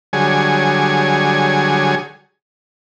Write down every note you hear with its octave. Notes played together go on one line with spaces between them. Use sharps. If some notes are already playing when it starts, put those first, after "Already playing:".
D3 F#3 G3 G#4 C#5 G#5